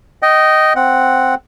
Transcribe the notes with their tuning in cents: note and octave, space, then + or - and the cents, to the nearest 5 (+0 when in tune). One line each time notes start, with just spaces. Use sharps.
D#5 +0 G5 -25
C4 +0 F#5 +0